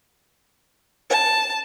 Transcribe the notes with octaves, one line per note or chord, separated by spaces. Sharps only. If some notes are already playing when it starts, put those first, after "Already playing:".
A5